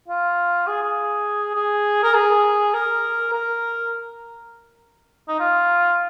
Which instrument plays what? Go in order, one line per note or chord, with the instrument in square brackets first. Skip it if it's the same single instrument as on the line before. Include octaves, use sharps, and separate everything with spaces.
[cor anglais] F4
G#4
G#4
G#4
A#4
G#4
A#4
A#4
D#4
F4